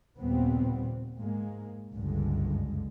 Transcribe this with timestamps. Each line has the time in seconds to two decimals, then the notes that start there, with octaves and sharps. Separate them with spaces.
0.19 D#2 A#2 C#3 G3 B3 C4
1.19 G#2 G#3 A#3
1.95 F#1 C#2 G2 D3 G#3